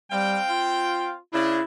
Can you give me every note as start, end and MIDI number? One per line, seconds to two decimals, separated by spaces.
0.12 0.39 55
0.12 1.13 60
0.12 1.13 77
0.12 1.13 79
0.49 1.17 65
1.33 1.60 49
1.33 1.60 62
1.33 1.63 64